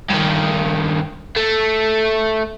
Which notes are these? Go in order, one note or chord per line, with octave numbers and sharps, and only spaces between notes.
G2 D#3
A3